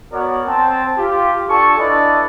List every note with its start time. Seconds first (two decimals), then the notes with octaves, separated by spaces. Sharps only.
0.13 B3 F#4 A#4 C#5 D5
0.47 C4 G5 A5
0.98 F4 G4
1.49 D4 F4 A4 G#5 A5 C#6
1.78 D4 E4 A4 B4 D5 D#5